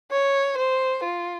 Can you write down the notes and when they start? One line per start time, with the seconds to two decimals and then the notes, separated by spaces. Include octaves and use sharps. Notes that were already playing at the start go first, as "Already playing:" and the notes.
0.12 C#5
0.58 C5
1.04 F4